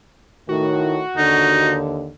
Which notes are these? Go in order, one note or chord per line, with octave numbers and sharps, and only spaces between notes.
A2 D#3 F#4
D#2 D3 D#4